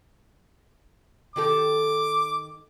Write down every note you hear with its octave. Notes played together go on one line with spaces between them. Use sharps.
D#3 G4 A4 D6